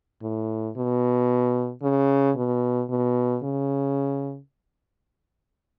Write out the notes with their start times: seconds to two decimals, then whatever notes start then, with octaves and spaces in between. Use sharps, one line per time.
0.22 A2
0.77 B2
1.82 C#3
2.36 B2
2.90 B2
3.43 C#3